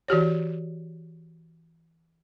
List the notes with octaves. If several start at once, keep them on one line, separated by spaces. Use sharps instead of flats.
E3 F#4 G4 C#5